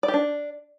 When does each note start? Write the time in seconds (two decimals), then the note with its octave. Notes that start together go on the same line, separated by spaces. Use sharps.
0.03 D5
0.08 G4
0.14 D4